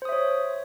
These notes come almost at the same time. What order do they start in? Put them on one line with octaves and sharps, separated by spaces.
C5 D#6 E5 C#5